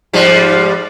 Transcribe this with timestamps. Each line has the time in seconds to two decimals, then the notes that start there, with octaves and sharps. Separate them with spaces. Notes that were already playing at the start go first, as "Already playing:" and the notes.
0.13 G#2 F3 G3